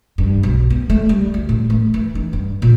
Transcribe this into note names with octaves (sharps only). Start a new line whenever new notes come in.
G2
B1
B3
A3
G3
D2
A2
A3
E3
D#4
G2
A#2